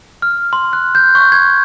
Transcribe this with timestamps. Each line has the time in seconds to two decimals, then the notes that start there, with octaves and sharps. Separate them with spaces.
0.22 F6
0.53 C6
0.73 F#6
0.95 G6
1.15 C#6
1.32 G#6